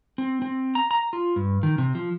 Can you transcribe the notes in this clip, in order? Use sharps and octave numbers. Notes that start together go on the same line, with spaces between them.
C4
C4
A#5
A#5
F4
G2
D#3
C3
F3